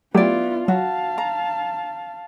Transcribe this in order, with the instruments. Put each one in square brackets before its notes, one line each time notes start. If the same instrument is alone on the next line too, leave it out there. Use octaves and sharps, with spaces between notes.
[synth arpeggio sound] F#3 A3 G4 [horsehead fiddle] B3 F4 [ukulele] E4 D5
[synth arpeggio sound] F#3 [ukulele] F#4 [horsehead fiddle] F5 A5
[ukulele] A#5